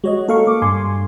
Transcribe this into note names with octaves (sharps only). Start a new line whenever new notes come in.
G#3 F#4 C#5 D#5
A#3 A4 F5 C#6
D6
G2 G#5 C6